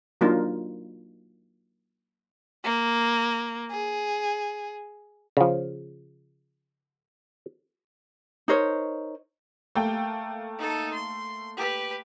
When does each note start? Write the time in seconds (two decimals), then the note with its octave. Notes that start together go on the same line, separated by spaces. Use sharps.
0.21 F#3 A#3 D4 D#4 F4
2.65 A#3
3.72 G#4
5.37 C#3 F3
8.48 D#4 A#4 C5 C#5
9.75 A3 A#3 G5
10.58 D#4 A4
10.93 C6
11.57 G4 B4